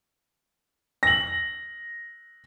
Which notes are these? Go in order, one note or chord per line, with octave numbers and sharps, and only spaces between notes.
A#6 F#7